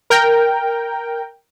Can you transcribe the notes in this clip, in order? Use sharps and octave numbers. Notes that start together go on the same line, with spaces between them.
A#4 G5